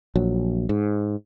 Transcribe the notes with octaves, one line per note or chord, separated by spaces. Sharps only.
A#1 F#3
G#2